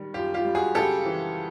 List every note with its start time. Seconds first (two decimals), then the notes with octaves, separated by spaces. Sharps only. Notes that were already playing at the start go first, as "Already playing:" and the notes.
Already playing: D#3 G3
0.14 F#2 F4 G4
0.34 F4 G4
0.45 G3
0.55 F#4 G#4
0.75 C#3 G4 A4
1.05 E3